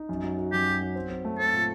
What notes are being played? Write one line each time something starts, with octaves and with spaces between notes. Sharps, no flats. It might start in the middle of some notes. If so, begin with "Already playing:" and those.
Already playing: D#4
F#2
F#3
F#4
F#2 G4
F#4
F#3
C4
C4
A3
C4 A4
A#2